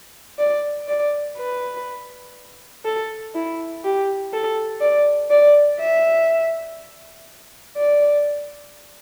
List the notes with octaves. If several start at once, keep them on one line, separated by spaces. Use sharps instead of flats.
D5
D5
B4
A4
E4
G4
A4
D5
D5
E5
D5